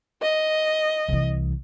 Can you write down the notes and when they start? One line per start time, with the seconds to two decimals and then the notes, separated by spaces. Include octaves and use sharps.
0.22 D#5
1.08 C2 E3